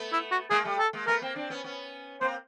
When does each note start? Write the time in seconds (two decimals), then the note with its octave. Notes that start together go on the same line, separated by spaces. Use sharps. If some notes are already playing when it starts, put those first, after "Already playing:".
Already playing: A3 B3
0.12 E4
0.31 F#4
0.50 G#3 A#3 G#4
0.64 G3 A3
0.79 A4
0.93 G#3 A#3
1.07 A3 B3 A#4
1.22 A#3 C4
1.36 C4 D4
1.50 B3 C#4
1.64 B3 C#4
2.21 A#3 C4 C5